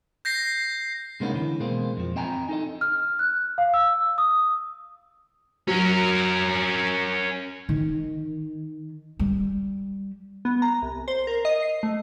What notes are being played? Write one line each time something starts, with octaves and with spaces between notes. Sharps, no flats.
G6 A#6 C7
C3 G#3 A#3 B3 C#4 D#4
D3 E3
B2 G#3 A#3 C4
F2 F3
C4 D#5 G5 G#5 A#5
D#4 A4 D#5
F6
F#6
F5
E6
D#6
F#3 C#4 A#4
D#3
G3
B3
A#5
C2
C5
A#4
D#5
C7
A3